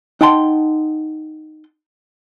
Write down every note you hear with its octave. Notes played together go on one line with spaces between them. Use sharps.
D#4 F#5 G5 A5 C6